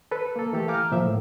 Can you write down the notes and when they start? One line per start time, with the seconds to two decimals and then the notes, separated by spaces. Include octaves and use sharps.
0.11 A4 B4
0.36 A#3 A4
0.53 E3 A3 G4 A4
0.68 F5 G#5 A#5 D6 F6 G6
0.92 A#2 F3 E5
1.06 A2